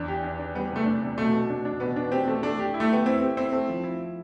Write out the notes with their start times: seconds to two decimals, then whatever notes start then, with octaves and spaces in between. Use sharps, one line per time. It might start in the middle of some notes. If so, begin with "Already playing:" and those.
Already playing: E2 D4
0.08 G4
0.23 D4
0.39 D4
0.55 G3 B3
0.71 C3 A3
0.86 D4
1.02 C3
1.17 B2 A3
1.33 B2
1.50 D4
1.65 D4
1.80 B2 B3
1.96 D4
2.12 C4 G4
2.27 A3
2.43 A3 D4
2.59 G4
2.74 E4
2.80 A3
2.91 B3 G4
3.06 C4 E4
3.21 G4
3.37 C4 E4
3.52 A3
3.69 F3
3.84 E4